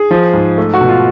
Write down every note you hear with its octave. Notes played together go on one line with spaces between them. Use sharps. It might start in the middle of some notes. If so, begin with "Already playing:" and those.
Already playing: G#4
F3
G#2
A3
F#4
B2
F4